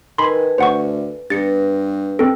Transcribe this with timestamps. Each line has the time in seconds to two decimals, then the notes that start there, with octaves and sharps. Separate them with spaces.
0.18 D#3 A4 B4 G#5 B5 C6
0.58 D2 C5 F#5 C#6
1.30 G2 B3 A6 A#6 C#7
2.19 C4 D4 A4